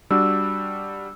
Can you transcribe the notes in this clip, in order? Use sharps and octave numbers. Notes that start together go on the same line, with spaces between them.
G3 D4 F#4 E6